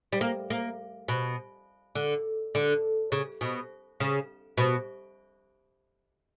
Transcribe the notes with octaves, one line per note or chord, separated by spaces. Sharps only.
G3
A#3
A#3
B2
D3
D3
C#3
B2
C#3
B2